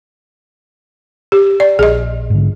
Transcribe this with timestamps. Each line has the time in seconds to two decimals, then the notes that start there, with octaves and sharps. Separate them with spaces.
1.32 G4
1.60 D5
1.79 A#1 G#4 D#5
2.30 G#2 D3